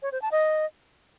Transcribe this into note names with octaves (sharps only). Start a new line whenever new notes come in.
C#5
C5
A5
D#5